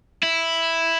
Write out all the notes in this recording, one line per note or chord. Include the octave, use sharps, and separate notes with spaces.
E4